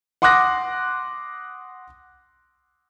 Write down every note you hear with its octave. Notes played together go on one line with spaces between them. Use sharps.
F#5 C6 D6 D#6 F#6 A#6